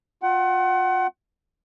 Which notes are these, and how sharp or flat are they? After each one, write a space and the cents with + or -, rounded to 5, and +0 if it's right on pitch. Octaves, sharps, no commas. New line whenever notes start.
F4 +30 F#5 +30